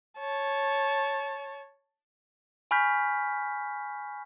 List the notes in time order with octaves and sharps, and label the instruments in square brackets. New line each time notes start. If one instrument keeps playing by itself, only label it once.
[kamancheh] C#5 A5
[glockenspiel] G#5 B5 C#6 F6 G6 B6